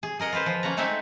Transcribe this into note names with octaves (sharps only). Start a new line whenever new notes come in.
G#4
G#4 A#4 D#5 F#5
F4 G#4 B4 C5
F3
A#3 C#4 F#5 A#5
G#3 A3 C4 D#4 E5 G#5